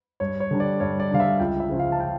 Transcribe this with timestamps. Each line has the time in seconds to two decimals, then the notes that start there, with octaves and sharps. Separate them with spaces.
0.20 G2 C#5
0.40 C#5
0.51 D3 G3 D4
0.60 D5
0.80 G2 C#5
1.00 D5
1.10 D3 G3 D4 F5
1.20 E5
1.40 C#2 G5
1.60 E5
1.70 C#3 F3 C#4
1.79 F5
1.92 A5
2.00 G5